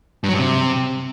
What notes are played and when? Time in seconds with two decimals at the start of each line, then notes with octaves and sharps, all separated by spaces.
0.24 G2
0.29 F#3
0.34 G2
0.39 C3